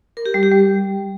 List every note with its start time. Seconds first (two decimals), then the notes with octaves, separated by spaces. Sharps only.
0.17 A#4
0.26 G4
0.34 G3
0.43 G4
0.52 G3